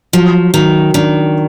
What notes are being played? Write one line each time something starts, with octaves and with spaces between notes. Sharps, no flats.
F3 F#3
D#3 F#3
D#3 D4